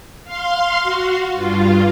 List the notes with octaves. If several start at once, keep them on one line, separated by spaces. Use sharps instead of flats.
F5 C6
F#4
G2 F4